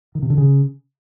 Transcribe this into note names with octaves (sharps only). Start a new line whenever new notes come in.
D#3
C3
D3
C#3